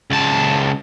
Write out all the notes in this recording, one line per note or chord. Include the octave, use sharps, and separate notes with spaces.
C#2 A5